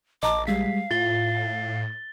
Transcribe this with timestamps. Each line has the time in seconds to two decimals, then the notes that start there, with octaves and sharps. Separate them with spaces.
0.23 A#1 D#5 A5 A#5 D6
0.47 G3 G#3 F5 B6
0.91 A2 F4 A6 G7